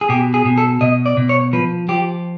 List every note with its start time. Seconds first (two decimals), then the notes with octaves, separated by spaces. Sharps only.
0.01 G#4
0.09 B2 G4
0.34 G#4
0.45 B2
0.58 A4
0.81 B2 D#5
1.06 D5
1.17 B2
1.29 C#5
1.53 F3 B4
1.89 F3 G4